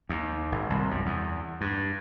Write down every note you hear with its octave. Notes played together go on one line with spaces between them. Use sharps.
D#2
G#1
C2
F#2
E2
G2